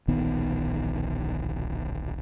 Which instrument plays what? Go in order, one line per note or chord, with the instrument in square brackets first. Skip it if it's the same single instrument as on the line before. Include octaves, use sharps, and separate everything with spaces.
[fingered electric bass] D1 A#1 D#3 B3